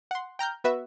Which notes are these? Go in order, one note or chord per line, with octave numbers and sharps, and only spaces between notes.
F#5 C6
G5 A#5 F6 G6
B3 F#4 B4 E5